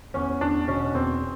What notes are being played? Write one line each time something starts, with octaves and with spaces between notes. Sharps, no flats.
E2 C#4
E2 D4
B2 C#4
E2 C4